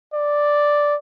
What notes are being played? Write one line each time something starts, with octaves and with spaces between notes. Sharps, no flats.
D5